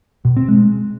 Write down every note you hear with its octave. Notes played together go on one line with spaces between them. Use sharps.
B2
C4
G#3